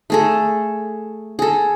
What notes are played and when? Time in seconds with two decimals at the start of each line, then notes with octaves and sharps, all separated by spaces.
0.10 A3 G#4 A4
1.39 G#4 A4